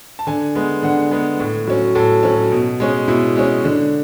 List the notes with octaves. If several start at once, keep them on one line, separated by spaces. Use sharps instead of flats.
A5
D3 G#5
G#3 B3
D3 F#5
G#3 B3
A2
F#3 C#4
A2 A4
F#3 C#4
B2
G#3 C#4
B2 E4
G#3 C#4
D3